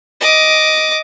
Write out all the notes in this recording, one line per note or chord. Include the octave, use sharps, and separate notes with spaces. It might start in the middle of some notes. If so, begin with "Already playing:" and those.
D#5 D6